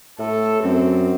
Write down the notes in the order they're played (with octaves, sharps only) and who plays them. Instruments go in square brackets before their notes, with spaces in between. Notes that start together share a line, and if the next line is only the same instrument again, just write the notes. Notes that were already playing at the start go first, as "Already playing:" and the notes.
[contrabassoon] A2 [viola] A4
[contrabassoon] F#2 [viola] C4